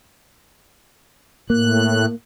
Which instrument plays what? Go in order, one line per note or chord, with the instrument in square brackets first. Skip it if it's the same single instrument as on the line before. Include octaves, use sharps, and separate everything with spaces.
[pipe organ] A2 F#6 [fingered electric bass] A#3